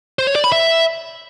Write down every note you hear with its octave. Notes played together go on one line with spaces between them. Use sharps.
C5
C#5
D5
B5
E5